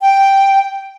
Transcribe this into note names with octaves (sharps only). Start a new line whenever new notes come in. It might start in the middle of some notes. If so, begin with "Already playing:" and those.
G5